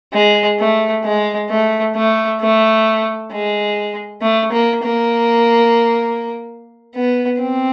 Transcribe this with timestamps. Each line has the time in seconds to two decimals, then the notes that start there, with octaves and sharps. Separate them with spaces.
0.13 G#3
0.59 A3
1.04 G#3
1.50 A3
1.96 A3
2.41 A3
3.32 G#3
4.22 A3
4.52 A#3
4.83 A#3
6.95 B3
7.40 C4